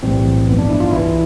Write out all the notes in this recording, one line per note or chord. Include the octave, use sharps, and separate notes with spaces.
B1 A2 E3 G3 C4
A1 G2 F3 B3
D4
E4
F4
C2 C3 E3 E4